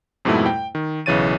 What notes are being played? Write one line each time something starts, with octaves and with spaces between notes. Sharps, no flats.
F2 G#2 B2 G3 A3 E4
G5
D#3
B1 C#3 E3 C#5 A6 D#7